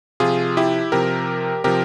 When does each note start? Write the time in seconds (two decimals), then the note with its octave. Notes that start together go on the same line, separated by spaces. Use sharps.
0.20 C3 F3 F4 G#4
0.57 E4 G4
0.92 C3 F3 G4 A#4
1.64 C3 F3 G4 A#4